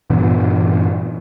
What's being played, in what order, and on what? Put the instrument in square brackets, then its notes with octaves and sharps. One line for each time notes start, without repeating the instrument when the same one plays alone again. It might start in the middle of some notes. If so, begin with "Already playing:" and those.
[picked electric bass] G2 A#2 E3 B3